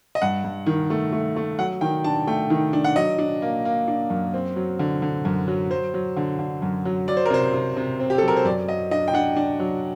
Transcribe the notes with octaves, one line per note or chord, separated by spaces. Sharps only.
D#5
G2 F#5
G2
D#3
A3
A3
A3
F#3 F#5
D#3 G5
D4 A5
A3 G5
D#3
D4
F#5
F#3 D#5
D4
A#3
A#3
D4
F#2
C4
F#3
D3
D3
F#2
F#3
F#3 C5
F#3
D3
D3
F#2
F#3
F#3 D5
C5
A#4
C3 C5
C3
C3
C4
G4
F#3 A4
A#4
C5
F#2 D5
F#3 D#5
D4 D#5
G5
D4 F#5
D4
F#3